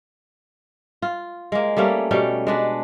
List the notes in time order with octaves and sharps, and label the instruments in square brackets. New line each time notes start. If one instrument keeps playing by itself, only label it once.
[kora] F4
G#3 A#3
G3 A3 A#3 C#4
B2 G3 C#4 G5
G#3 D4 B4